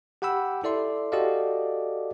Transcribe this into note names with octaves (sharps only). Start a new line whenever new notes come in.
G4 F#5 G5 B5 E6
E4 A4 D5 E5 C6
F#4 G4 A4 D5 D#5 F5